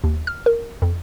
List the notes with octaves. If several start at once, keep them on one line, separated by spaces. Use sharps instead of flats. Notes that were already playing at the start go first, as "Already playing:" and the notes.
D#2
F6
A#4
F2